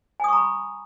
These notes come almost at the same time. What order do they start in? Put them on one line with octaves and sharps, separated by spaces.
G#5 D#6 C#6 A#5 B5